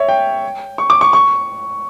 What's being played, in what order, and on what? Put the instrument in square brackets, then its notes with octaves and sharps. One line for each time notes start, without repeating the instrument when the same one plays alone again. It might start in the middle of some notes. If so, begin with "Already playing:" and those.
Already playing: [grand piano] C#5 E5
G5
C#6
D6
C#6
C#6